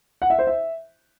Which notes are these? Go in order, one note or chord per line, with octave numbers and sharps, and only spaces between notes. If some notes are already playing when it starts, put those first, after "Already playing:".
F#5
E5
C5
E5